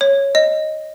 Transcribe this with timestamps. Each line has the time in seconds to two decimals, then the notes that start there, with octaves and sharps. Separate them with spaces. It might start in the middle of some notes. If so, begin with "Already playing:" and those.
0.01 C#5
0.35 D#5